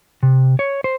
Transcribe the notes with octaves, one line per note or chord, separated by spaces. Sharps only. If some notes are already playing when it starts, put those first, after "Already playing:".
C3
C#5
C5